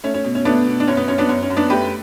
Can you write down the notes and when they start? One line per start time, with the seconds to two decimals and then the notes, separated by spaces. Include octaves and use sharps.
0.04 A3 C#4
0.14 C#4
0.25 B2
0.35 C#4
0.45 A3 B3 D4
0.67 B2
0.80 D4
0.88 F#2 C#4
0.97 B3
1.08 F#2 C#4
1.18 B3 D4
1.29 F#2 C#4
1.43 C#4
1.50 F#2
1.57 B3 D4
1.70 A3 G4 B4